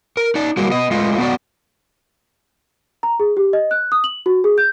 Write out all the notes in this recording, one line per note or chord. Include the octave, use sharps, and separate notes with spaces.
A#4
D#4 D5
G3 G#3 A#3 F#4
B3 D#5
G#3 A3 F4 D#5
B3 F#4 D5
A#5
G#4
G4
D#5
F#6
D#6
F#7
F#4
G#4
G6